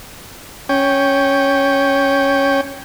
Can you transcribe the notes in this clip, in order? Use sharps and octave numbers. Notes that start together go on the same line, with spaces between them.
C#4 G5